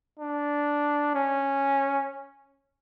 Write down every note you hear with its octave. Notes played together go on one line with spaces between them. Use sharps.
D4
C#4